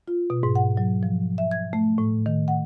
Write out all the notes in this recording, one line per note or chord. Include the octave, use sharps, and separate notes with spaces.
F4
B2
G#2
F#5
F#3
F3
E5
G#6
A3
A2
D#3
F#5